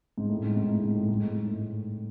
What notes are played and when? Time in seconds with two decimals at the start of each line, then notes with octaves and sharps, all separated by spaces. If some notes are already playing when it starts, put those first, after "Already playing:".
0.18 G#2
0.30 A2
0.43 G#2
0.56 G#2
0.69 A2
0.83 G#2
0.96 A2
1.09 G#2
1.22 A2
1.35 G#2
1.48 A2